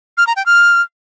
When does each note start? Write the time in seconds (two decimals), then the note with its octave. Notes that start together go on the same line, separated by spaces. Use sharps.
0.17 F6
0.27 A#5
0.36 G5
0.46 F6